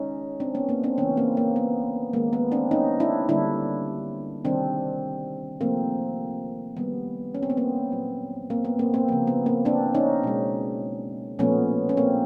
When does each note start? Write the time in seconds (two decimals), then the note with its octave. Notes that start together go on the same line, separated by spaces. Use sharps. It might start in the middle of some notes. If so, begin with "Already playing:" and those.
Already playing: D#3 G#3 C#4 D#4
0.40 C4 D4
0.55 B3 C#4
0.69 A#3 C4
0.83 C4 D4
0.98 C#3 E3 A3 B3 C#4
1.17 A#3 C4
1.37 A#3
1.56 B3
2.13 D#3 G#3 A#3
2.33 B3
2.52 C4 D4
2.71 C#4 D#4
3.00 D4 E4
3.29 D3 G3 A#3 D4 E4
4.45 C3 D#3 G3 C4 D4
5.60 C3 F3 A3 A#3 C4
6.76 D#3 G3 A#3 B3
7.35 C#4
7.43 C4
7.50 B3
7.57 A#3 C4
7.92 A#2 F#3 A#3
8.50 A#3 C4
8.65 B3
8.79 A#3 C4
8.94 A#3 C4
9.08 C#3 F3 A#3
9.27 B3
9.46 A#3 C4
9.65 C4 D4
9.95 C#4 D#4
10.23 B2 G#3
11.39 A#2 F3 A3 B3 C#4
11.89 C#4
11.97 A#3 C4